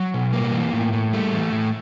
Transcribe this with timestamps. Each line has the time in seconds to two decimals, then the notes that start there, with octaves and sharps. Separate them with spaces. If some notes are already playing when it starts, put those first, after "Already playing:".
Already playing: F#3
0.14 B2
0.33 G3 A#3
0.53 E3
0.73 A2
0.93 A2
1.13 G3 A3
1.33 E3
1.52 A2